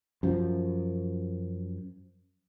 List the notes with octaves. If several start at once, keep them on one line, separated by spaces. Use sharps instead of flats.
F#2 F3